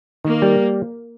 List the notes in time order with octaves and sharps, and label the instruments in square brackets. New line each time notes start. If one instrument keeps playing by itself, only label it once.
[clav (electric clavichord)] D#3 [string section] A#3
[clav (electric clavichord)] G3